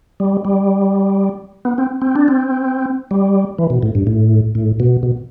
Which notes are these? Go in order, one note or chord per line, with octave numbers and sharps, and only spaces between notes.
G3
G3
B3
C4
C4
D4
C4
G3
E3
B2
A2
G2
A2
A2
B2
B2